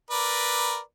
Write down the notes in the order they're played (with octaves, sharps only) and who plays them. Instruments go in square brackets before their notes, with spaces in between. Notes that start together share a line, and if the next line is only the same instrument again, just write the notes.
[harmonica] A#4 B4 D5